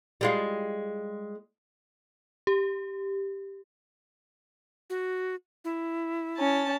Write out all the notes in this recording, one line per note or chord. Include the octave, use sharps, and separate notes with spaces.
G3 G#3 F4
G4
F#4
E4
C#4 A5